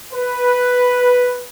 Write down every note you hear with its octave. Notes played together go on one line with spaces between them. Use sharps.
B4